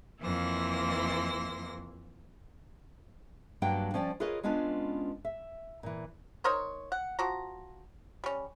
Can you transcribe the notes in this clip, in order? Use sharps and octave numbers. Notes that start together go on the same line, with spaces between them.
F2 E3 A#3 E4 C6 A#6
G2 F#3 A#3 D4 F#5 G5
F3 C#4 D5 F#5 G5
F4 G#4 A#4 B4 C#5 D#5
G#3 B3 C#4 D4 F4 B4
E5
A#2 E3
D#4 A#4 C5 C#5
F#5
F3 F#4 A#5
G3 C#4